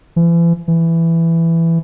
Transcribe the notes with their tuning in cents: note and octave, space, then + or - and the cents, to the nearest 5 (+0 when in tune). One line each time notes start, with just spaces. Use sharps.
E3 +40
E3 +10